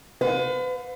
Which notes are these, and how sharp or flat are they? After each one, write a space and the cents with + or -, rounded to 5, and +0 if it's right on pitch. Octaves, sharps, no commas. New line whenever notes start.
B4 +40 F5 +40